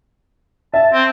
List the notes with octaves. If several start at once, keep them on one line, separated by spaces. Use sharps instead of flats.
E5 A5
C4